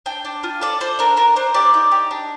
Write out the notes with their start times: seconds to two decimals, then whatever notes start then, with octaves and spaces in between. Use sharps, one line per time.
0.06 D4 G5
0.25 D4
0.43 F4
0.61 A4 D5
0.80 A4 C5
0.99 D4 A#4
1.17 D4 A#4
1.36 D4 C5
1.54 G4 D5
1.74 D#4
1.92 G4
2.11 D4